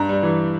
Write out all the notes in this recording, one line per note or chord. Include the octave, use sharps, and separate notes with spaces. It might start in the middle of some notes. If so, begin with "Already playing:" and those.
Already playing: G2 A#5
G3
E3